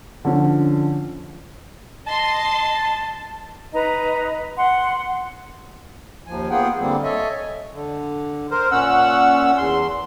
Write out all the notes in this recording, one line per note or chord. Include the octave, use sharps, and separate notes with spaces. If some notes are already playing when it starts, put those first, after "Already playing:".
D3 F3 C#4
D#5 A5 C6
D#4 B4 D#5 A#5
F#5 C6
D#2 F3 G#5
A#3 B3 F4 G#4 F#5 G5
D3 G3 A#3 C4
A4 C#5 D#5 E5 G#5
D3
A#4 C5
A#2 C#4 F#5 E6
E2 C6